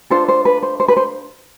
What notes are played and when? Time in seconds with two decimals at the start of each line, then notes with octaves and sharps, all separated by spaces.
0.10 D4 F4 A4 C5
0.28 C5
0.45 B4
0.63 C5
0.80 C5
0.88 B4
0.97 C5